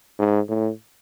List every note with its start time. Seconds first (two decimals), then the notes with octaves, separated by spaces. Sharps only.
0.19 G#2
0.49 A2